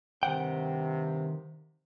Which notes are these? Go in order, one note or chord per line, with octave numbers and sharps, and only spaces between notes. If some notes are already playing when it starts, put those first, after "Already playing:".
G2 C3 D#3 F#5 G5